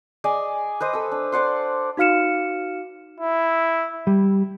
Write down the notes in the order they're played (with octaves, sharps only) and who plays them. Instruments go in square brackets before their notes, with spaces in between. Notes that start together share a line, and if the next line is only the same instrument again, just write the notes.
[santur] G#4 D5 D#5 G#5
B4 C5 D#5
A4 E6
D4
C5 D5 F#5 C6
[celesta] D#4 F#4 F5 F6 C#7 E7
[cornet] E4
[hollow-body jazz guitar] G3